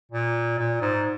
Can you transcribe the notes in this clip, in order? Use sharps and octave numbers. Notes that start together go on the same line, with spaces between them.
A#2
A#2
G#2